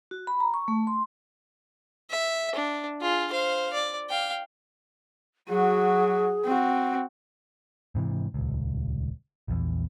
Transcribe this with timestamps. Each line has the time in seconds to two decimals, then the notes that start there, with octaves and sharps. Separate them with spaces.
0.11 F#4
0.27 B5
0.40 A#5
0.54 C#6
0.68 A3
0.87 C6
2.10 E5
2.55 D4
3.01 F4 G#4
3.31 C5 F5
3.73 D5
4.09 F5 G5
5.49 F#3 F#4 G#4
6.45 C4 F#4
7.95 G#2 C3 E3
8.34 D#1 C#2
9.48 A#1 E2